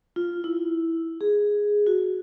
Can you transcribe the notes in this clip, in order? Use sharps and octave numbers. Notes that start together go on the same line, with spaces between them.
F4
E4
G#4
F#4